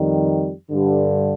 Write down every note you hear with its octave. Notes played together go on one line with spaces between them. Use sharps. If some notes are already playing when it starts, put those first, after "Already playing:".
Already playing: F2 D#3 G3
G2 D3 G3